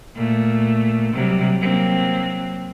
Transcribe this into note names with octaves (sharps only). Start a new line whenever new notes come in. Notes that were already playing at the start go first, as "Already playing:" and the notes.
A#2 A3
C3 F#3 G3
F#3 A#3 C4